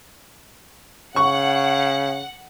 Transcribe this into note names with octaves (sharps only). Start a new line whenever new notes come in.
C#3 F#5 C#6